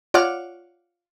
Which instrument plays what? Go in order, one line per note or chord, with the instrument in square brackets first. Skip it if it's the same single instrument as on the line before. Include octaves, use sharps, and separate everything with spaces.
[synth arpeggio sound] F4 C#5 D5 F#5 D6 F6